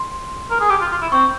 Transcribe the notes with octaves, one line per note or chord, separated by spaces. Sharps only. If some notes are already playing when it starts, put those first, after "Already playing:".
Already playing: C6
A#4
G#4
G4
F4
F4
E4
C4 C#6